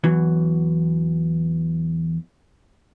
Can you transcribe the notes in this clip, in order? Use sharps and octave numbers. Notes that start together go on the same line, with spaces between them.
E2 E3 F#3